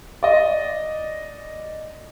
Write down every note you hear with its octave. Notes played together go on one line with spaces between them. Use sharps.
D5 D#5